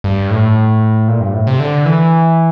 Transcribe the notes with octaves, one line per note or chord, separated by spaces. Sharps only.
G2
A2
A#2
G2
A2
C3
D3
E3